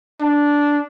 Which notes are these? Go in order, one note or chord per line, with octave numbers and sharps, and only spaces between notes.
D4